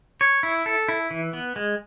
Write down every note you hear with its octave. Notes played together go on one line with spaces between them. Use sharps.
C#5
E4
A4
E4
E3
B3
G#3